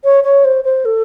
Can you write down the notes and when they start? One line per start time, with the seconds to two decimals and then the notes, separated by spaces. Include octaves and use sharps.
0.04 C#5
0.24 C#5
0.45 C5
0.64 C5
0.85 A4